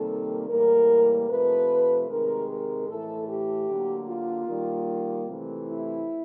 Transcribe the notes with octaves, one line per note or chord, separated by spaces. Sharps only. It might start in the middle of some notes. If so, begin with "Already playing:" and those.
Already playing: C3 D#3 G3 A#3 A4
A2 E3 G3 A#3 A#4
C3 F3 A3 B4
C3 D#3 G#3 A#4
A#4
A2 E3 A3 A4
G4
D3 F#3 A#3
F4
D#3 G3 A#3
C3 E3 A3
E4